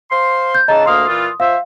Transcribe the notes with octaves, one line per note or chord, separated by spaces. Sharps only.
C5 F5 C6
G6
C#3 E3 D#5 A5 A#5
D2 A#3 F5 C6 D#6
A#2 E3 F4
F3 C5 E5 F5